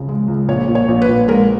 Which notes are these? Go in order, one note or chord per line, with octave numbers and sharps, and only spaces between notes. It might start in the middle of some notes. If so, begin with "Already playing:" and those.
Already playing: G#1 C#2 C#3
G#3
C#2
A#1 C#5
A#2
C#5
A#1
B4
A#1
G#3 A#4